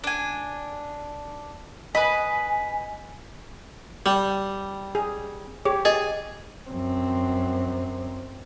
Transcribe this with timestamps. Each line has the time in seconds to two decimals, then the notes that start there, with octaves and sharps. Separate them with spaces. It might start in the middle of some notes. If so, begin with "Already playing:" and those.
0.04 D4 G#5
1.95 B4 D#5 G#5 B5
4.06 G3
4.95 G#4
5.65 G4 G#4 C#5
5.85 G#4 D#5
6.70 F#2 C4